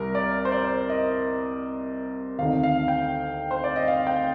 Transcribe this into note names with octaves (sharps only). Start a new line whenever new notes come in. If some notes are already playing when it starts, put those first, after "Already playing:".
Already playing: C2 C3 G3 A#4
D5
C5
D5
D#5
D2 C3 D#3 F5
F5
G5
C5
D5
D#5
F5
G5